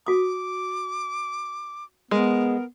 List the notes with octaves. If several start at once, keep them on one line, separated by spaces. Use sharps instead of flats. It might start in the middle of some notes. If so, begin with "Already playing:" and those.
F#4 D6 D#6
G#3 B3 A#4